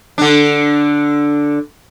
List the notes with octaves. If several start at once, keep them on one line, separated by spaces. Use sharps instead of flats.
D3 D4